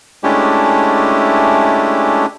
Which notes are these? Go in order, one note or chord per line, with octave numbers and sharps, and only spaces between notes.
G#3 A3 C#4 D4 E4 G4